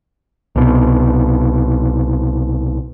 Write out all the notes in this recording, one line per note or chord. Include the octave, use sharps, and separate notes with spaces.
C2 B2